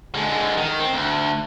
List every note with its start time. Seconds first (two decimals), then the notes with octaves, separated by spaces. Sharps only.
0.15 D3 G#3
0.57 D#3
0.79 C4
0.93 D2